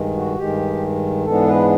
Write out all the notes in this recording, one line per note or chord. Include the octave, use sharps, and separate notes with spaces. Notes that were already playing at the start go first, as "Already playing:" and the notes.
Already playing: G2 D#3 G#3
F#4
G2 D#3 G#3 G4
G#2 E3 G#3 B3 D4 A4
B4